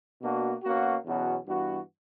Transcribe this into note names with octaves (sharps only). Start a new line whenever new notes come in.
B2 A#3 D4 F#4
B2 A#3 C#4 F#4
E2 B2 F#3 C#4 F#4
G2 E3 B3 F#4